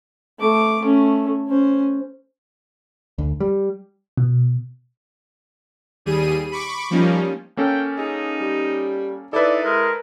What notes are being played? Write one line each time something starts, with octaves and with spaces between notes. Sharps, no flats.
A3 D6
A3 C#4
C#4 C5
D2
G3
B2
D#2 G3 G#4 D#7
B5 C#6 D6
F3 G3 A#3 C#4 D#4
A#3 C#4 A4 G5
D#4 G#4
G3
D#4 E4 A4 B4 D5
G#3 A#4